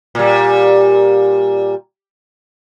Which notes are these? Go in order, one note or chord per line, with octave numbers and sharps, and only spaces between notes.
A#2 G3